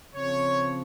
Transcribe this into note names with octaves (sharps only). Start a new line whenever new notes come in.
C#3 F3 C4 C#5